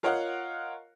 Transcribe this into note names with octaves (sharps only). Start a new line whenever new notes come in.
F4 A#4 C#5 D#5 F5 F#5